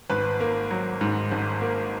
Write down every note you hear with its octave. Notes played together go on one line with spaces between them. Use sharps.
G#1 B4
A#3
F#3
G#2
G#1
A#3